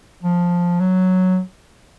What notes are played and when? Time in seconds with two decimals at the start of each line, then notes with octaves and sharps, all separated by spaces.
0.23 F3
0.80 F#3